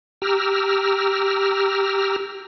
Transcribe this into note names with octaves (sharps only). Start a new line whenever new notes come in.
G4 A#5 E6 F6